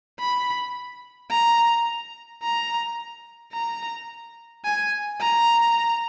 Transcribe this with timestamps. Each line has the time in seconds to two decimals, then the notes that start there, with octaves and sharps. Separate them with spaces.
0.20 B5
1.31 A#5
2.43 A#5
3.54 A#5
4.65 G#5
5.21 A#5